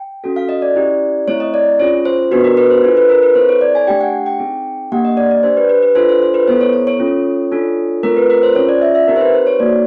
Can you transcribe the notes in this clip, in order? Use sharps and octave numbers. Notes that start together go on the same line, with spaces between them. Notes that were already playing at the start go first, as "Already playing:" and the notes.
Already playing: G5
C#4 F#4 A4
F5
D#5
D5
C#4 E4 G4
A3 C4 E4 C#5
D#5
D5
C#4 F4 G#4 C#5
C5
B3 D4 F#4 B4
A#4
B4
C5
D4 F4 A4 B4
B4
A#4
B4
C4 E4 A4 C5
C#5
D5
G#5
A3 D4 G4 G5
F#5
G5
C4 D#4 G#4
A#3 D4 G4 F#5
D#5
D5
D5
D4 G4 C5
B4
B4
B4
D4 F4 A4 C5
C5
C5
B4
B3 E4 A4 C5
C#5
C#5
C#5
C#4 F4 A4
D4 F4 A4
A3 C4 F4 A4 A#4
B4
A#4
C5
C#4 F4 G#4 C#5
D5
E5
E5
C4 D#4 G4 A#4
C5
B4
C5
C#5
A#3 D#4 F#4 A4 D5